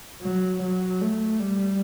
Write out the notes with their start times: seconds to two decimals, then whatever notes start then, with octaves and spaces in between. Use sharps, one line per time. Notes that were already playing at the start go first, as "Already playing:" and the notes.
0.22 F#3
0.62 F#3
1.01 A3
1.40 G3